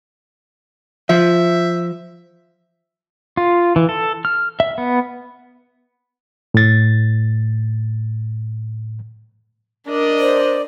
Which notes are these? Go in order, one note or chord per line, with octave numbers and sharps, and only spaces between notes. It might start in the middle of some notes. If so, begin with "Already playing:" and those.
F3 E5
F4
E3
A4
F6
E5
B3
A2 A6
D4 A#4 D5 D#5
C5